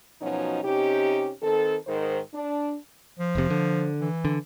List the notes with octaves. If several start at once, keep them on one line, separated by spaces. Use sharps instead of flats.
B2 F3 F#3 C#4 D#4
C3 C#4 D#4 G4
D#3 C4 A4
G#2 D#3 A#4 C5
D4
F3
F1 C3
D3
E3
D3